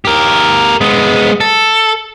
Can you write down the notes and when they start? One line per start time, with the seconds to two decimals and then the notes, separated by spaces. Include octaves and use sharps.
0.05 G4 A#4
0.81 G#3 B3
1.41 A4